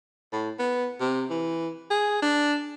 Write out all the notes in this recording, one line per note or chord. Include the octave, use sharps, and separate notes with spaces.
A2
B3
C3
E3
G#4
D4